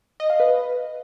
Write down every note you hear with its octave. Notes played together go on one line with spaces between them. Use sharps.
D#5
F5
B4